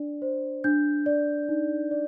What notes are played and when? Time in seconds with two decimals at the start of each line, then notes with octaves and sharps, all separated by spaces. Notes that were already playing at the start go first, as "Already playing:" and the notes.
Already playing: D4 D5
0.22 C5
0.64 D4 G6
1.06 D5
1.49 D#4
1.91 D5